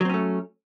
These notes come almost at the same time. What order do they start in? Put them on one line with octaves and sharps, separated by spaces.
F#3 C4 C#4 A3